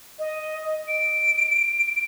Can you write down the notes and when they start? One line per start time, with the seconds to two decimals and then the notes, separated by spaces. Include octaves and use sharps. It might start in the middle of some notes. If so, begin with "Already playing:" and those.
0.19 D#5
0.88 D7